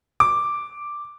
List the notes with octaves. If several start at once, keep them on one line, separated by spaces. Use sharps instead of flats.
D6